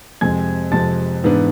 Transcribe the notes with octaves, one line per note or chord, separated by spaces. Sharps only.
F2 C3 G#3 C4 G#5 G#6
F2 C3 G#3 C4 A5 A6
G#2 E3 B3 D4